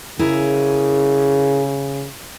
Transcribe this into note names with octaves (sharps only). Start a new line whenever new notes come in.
C#3 E4 G#4 A#4